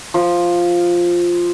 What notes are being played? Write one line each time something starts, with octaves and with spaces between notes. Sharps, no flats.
F3